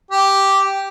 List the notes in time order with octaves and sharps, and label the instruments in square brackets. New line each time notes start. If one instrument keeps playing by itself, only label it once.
[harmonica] G4